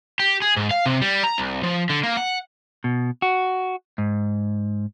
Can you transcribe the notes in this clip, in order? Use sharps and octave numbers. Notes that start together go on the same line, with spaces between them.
G4
G#4
G#2
F5
C3
G3
A#5
C2
F3
D3
A#3
F#5
B2
F#4
G#2